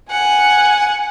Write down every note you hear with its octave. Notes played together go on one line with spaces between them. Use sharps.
F#5 G#5